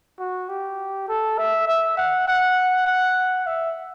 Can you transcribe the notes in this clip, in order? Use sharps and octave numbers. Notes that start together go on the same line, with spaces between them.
F#4
G4
A4
E5
E5
F#5
F#5
F#5
E5